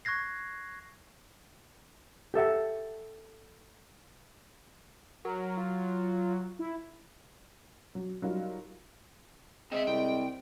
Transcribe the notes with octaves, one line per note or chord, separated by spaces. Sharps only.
C#6 F#6 G#6 A#6 C7
G4 A4 E5 F#5
F#3 A#4
F4
E4
F#3
F#3 G3 D#4 F4 A#4
G#3 C4 C#5 E5
C2 G5